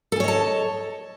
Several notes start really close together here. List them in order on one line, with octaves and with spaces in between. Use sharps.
A4 G#5 C#5 D#5 A5